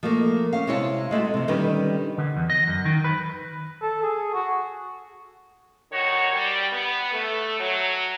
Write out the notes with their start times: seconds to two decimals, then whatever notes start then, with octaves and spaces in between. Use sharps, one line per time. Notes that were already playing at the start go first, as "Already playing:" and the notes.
0.03 F3 A3 A#3
0.53 C#4 F5
0.67 C3 G#3 E4 C#5 A5
1.11 G#3 A3 F4 F#4
1.34 C3 F3
1.48 D3 D#3 G3 C#4 D#4 B4
2.18 D3
2.36 E2
2.50 D#5
2.67 F#2
2.85 D#3
3.04 B4
3.82 A4
4.03 G#4
4.34 F#4
5.92 G2 D#3 F#4 C#5
6.34 G3
6.73 B3
7.13 A3
7.59 F#3